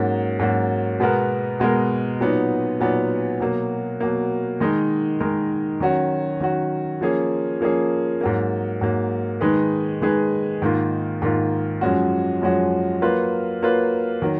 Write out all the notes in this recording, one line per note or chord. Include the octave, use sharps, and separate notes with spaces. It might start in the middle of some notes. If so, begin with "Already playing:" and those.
Already playing: G#2 F#3 A#3 C#4 F#4
G#2 F#3 A#3 C#4 F#4
B2 G#3 B3 F#4 A#4
B2 G#3 B3 F#4 A#4
A#2 F#3 B3 D#4
A#2 F#3 B3 D#4
B2 F#3 A#3
B2 F#3 A#3
D#3 G#3 D#4 A#4
D#3 G#3 D#4 A#4
D#3 F#3 C#4 F#4
D#3 F#3 C#4 F#4
F3 A#3 C#4 G#4
F3 A#3 C#4 G#4
G#2 F#3 A#3
G#2 F#3 A#3
D#3 G#3 D#4 G#4 B4
D#3 G#3 D#4 G#4 B4
G#2 D#3 A#3 F4
G#2 D#3 A#3 F4
F#2 F3 G#3 C#4 F#4
F#2 F3 G#3 C#4 F#4
F#3 A#3 F4 B4
F#3 A#3 F4 B4
D#3 F#3